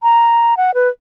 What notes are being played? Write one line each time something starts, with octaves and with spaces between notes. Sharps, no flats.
A#5
F#5
B4